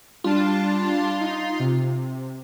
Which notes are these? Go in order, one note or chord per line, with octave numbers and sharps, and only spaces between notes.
G3 D4 F4 A5
D#4
C3